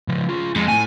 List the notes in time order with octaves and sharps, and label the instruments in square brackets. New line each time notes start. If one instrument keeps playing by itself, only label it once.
[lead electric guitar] C#3 F3
F4 G#4
[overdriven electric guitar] F2 [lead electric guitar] G#3
[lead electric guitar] A3 E4 [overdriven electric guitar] G#5